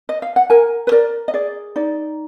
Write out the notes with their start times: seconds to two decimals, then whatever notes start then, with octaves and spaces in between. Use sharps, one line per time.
0.09 D#5
0.22 F5
0.36 F#5
0.50 A#4 G#5
0.87 B4
0.92 A#4 D5
1.28 D#5
1.34 G#4 D5
1.76 D#4 D5